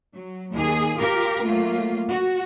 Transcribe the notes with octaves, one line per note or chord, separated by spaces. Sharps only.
F#3
D#2 G#4
F4 G4 A#4
F#3 A3 A#3 F4
F#4